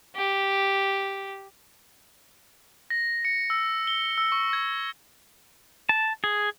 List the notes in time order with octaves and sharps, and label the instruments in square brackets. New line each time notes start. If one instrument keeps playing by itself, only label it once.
[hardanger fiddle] G4
[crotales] A#6
C#7
E6
G7
E6
C#6
G#6
[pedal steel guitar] A5
G#4